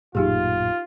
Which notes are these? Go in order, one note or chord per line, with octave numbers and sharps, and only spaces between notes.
A1 F#2 A#2 D#4 F4 G4 G#4